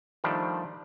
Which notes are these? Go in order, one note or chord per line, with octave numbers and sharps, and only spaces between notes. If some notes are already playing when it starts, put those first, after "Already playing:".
D#3 F3 G3 A3 D4